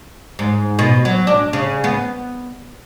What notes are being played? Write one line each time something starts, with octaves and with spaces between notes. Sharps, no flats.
G#2
B2
F#3
D4
C#3
B3